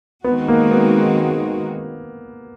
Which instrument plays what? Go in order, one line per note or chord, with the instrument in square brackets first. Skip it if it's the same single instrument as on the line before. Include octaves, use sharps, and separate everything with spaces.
[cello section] D#3 G#3 C4 D#4 F#4 [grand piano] B3
[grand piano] A#3
B3